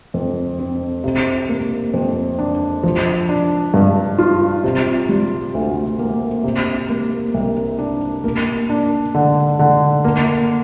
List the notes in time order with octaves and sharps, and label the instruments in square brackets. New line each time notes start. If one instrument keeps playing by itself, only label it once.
[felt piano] F2
C4
C3
A#3
F2
D4
F3
D4
G2
F4
C3
G3
D2
A#3
C3
A#3
C2
D4
A#3
D4
D3
D3
A#3